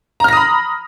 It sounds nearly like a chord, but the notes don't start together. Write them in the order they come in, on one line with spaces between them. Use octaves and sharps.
A#5 F6 A#6 D#6 B5